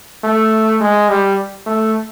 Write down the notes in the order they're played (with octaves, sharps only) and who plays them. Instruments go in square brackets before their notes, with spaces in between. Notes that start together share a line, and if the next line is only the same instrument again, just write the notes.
[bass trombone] A3
G#3
G3
A3